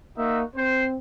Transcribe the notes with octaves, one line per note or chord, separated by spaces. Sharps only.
A#3 D#4 F#4 E5
C4 C5